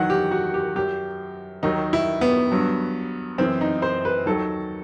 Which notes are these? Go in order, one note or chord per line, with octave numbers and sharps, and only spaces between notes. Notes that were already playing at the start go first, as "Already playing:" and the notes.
Already playing: E2 D#3 F#3 F#5
G4
F#4
G4
F#2 F#3 G4
D#2 D#3 F#3 D#4
E4
B3
G2 F#3
F#2 E3 C4
D#4
C5
B4
D#2 D#3 F#3 A4